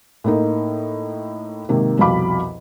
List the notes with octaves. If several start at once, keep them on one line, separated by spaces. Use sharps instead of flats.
A2 A#3 D#4
G#2 C3 D#3 A#3
C2 F2 B2 F5 B5 D6